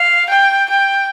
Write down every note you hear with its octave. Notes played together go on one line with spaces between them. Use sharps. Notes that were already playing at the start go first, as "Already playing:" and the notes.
Already playing: F5
G5
G5